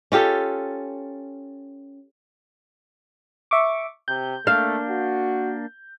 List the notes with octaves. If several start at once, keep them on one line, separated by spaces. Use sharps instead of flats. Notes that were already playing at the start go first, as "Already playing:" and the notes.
C#4 F4 G4 A4
E5 C#6 D6
C3 G6
A3 A#3 D4 F5
F#4